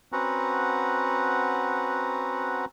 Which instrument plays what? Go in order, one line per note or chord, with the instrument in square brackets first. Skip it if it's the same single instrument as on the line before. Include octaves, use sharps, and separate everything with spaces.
[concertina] C4 C#4 F#4 B4 F#5 A#5